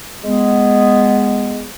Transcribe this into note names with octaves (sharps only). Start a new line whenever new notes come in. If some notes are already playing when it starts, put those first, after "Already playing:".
G#3 B3